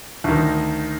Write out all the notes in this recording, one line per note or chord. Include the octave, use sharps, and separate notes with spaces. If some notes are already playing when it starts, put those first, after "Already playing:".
D2 D#3